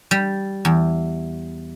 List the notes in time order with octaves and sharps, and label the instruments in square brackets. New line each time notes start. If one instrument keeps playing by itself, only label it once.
[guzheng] G3
E2